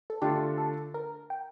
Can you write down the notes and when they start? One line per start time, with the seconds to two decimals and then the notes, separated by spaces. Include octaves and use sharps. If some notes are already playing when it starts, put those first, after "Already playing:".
0.10 A4
0.22 D3 A3 D4 F4 G4
0.58 A4
0.94 A#4
1.30 G5